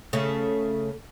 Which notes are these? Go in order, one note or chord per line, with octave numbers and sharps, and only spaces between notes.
C#3 A3